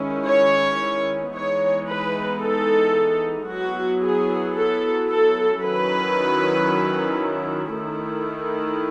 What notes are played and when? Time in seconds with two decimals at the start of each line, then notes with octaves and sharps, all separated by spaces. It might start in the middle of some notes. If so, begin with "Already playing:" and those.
Already playing: D#3 G#3 C#4 E4
0.27 C#5
1.34 E3 G#3 B3 D#4 C#5
1.88 B4
2.41 A4
3.48 F#3 B3 E4 F#4
4.01 G#4
4.55 A4
5.08 A4
5.62 D#3 F#3 C#4 E4 B4
7.75 D#3 A3 E4